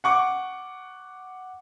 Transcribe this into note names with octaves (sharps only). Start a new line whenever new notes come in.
F#5 C#6 D6